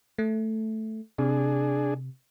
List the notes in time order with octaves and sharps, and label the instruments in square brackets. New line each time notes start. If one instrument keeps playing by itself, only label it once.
[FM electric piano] A3
[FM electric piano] C3 [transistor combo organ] D4 G#4